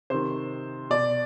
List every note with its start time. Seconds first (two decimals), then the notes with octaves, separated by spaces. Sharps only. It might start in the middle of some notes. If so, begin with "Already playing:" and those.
0.10 C3 D#3 C5
0.90 B2 D5